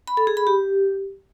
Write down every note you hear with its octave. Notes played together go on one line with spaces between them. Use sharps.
B5
A4
G#4
B5
G4